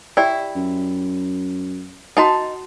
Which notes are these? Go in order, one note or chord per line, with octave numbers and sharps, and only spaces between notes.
E4 G4 D5 G5
F#2
D#4 F#4 F#5 A5